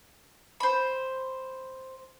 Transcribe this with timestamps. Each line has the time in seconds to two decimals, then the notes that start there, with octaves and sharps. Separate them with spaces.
0.60 C5 B5